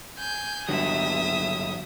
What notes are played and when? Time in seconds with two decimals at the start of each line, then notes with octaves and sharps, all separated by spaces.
0.18 G#5 G6
0.69 G2 D3 F#3 E5 D#6